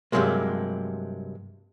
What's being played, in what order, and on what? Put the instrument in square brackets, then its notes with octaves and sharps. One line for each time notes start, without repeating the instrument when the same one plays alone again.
[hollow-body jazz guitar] G2 C3 D#3 F#3 G#3 A#3